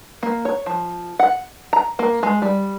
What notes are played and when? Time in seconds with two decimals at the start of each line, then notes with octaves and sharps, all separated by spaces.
0.23 A#3
0.45 C#5
0.66 F3
1.19 F#5
1.73 A#5
1.99 A#3
2.23 G#3
2.42 G3